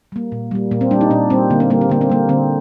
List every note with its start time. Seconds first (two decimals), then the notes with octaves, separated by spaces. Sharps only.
0.12 G3 A#3
0.32 A#2
0.51 G3 A#3
0.71 A#2 A#3
0.81 C4
0.91 G3 A#3 D4
1.01 D#4
1.10 A#2 D4
1.30 G3 A#3 C4
1.50 D3 A#3
1.60 C4
1.70 G3 A#3
1.81 C4
1.89 D3 A#3
2.01 C4
2.09 G3 A#3
2.29 D3 C4